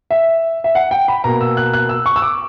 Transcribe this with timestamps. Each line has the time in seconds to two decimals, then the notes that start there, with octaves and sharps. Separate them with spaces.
0.11 E5
0.64 E5
0.75 F#5
0.91 G5
1.08 B5
1.24 B2 A#3 A#5
1.41 E6
1.57 F#6
1.73 F#6
1.89 E6
2.06 C#6
2.16 E6
2.22 D6